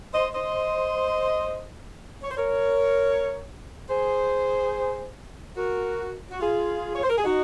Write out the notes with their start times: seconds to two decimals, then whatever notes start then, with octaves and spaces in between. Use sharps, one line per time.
0.13 C5 D#5
0.34 C5 D#5
2.23 C#5
2.31 C5
2.37 A#4 C#5
3.90 G#4 C5
5.57 F#4 A#4
6.31 F#4
6.40 F4 G#4
6.94 C#5
7.03 C5
7.10 A#4
7.18 G#4
7.24 D#4 F#4